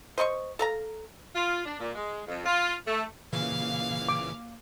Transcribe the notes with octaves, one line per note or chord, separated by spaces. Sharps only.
C5 D#5 C6 C#6
A4 F5 A#5
F4
D4
A#2
G#3
F2
F4
A3
A#2 C#3 E3 A#3 F5 F6
D6